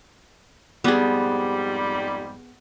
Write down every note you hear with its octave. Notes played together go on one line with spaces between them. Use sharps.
F2 G#2 G3 B3 G#4